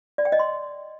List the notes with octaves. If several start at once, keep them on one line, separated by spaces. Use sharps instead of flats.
D5
G5
D#5
C6